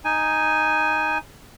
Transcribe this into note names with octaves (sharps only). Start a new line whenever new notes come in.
D#4 G#5